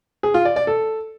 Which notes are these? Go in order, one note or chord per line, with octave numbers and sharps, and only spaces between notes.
G#4
F4
D5
D5
A4